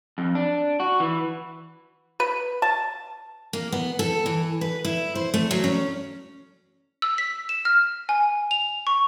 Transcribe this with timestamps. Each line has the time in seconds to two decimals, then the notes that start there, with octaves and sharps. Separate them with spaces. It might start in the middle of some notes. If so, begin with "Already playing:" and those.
0.18 F2
0.35 D4
0.80 F#4
1.00 E3
2.20 B4
2.62 A5
3.53 A#3
3.72 B3
3.99 A4
4.26 E3
4.61 B4
4.85 E4
5.15 C5
5.34 A3
5.51 F#3
5.64 C#4
7.02 E6
7.18 B6
7.49 E7
7.65 F6
8.09 G#5
8.51 F7
8.87 C#6